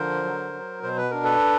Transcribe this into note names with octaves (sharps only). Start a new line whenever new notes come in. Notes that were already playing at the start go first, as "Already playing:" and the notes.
Already playing: D3 F3 A#4 C5
F#3
F#3
B2 C5
B4
D4 A#4
A4 B4